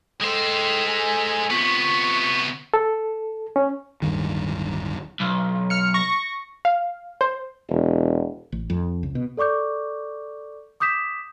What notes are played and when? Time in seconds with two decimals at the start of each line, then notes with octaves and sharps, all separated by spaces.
0.21 G#3 A4 C5 G5
0.86 A4 G#5
1.50 C3 B3 F4 C#6
2.74 A4
3.56 C#4
4.02 D1 G2 D#3
5.20 B1
5.70 F6 C#7
5.94 C#6 A#6
6.65 F5
7.21 C5
7.69 E1
8.52 A1
8.70 F2
9.03 C#2
9.15 B2
9.37 A4 D5 C#6 D6 G6
10.80 D6 D#6 G6 B6 E7